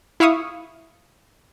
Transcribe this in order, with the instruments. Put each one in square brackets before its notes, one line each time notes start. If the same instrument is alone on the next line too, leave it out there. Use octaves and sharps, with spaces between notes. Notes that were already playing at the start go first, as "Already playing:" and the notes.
[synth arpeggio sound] E4 E5 F5 C#6 D#6